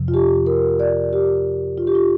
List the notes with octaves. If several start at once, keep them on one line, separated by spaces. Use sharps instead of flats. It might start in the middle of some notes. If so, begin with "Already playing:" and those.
Already playing: F2 C3 F3
F4
G4
A#4
D5
G4
F4
G4
F4